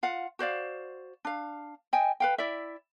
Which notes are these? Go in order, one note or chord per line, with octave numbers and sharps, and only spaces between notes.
F4 F5 F#5
F#4 C5 D5 F5
D4 F5
D#5 G5 G#5
B4 F5 G5
E4 D5 E5